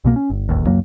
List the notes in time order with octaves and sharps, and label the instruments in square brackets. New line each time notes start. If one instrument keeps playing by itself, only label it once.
[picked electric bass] C2 B2 A#3
C#4
G1
E1 A1 D#2
C#2 F#2 F#3 A#3